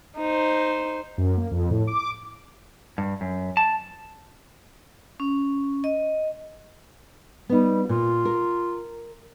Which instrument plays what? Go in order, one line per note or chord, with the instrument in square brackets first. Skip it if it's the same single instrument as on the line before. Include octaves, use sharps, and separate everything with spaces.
[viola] D#4 C5
[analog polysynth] F#2
A#3
F2
A2
D6
[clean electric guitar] G2
F#2
A5
[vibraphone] C#4
D#5
[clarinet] G3 [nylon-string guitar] B3 D#4
[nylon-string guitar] A#2 [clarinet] F4
[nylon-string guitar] A#4